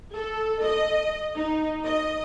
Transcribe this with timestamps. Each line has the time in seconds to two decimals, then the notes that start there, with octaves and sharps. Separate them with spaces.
0.15 A4
0.64 D#5
1.36 D#4
1.85 D#5